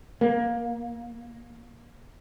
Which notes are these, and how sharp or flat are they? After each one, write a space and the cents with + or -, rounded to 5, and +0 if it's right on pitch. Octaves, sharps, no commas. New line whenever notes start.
A#3 +15